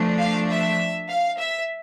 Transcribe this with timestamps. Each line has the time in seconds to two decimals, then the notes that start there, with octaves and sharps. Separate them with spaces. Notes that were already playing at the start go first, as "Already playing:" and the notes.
Already playing: F3 A3 D4
0.18 F5
0.48 E5
1.09 F5
1.39 E5